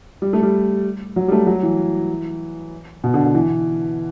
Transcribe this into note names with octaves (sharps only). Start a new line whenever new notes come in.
G3
A3
G3
F#3
G3
A3
F#3
E3
B2
D3
D3
E3